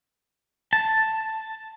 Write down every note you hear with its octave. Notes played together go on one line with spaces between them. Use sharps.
A5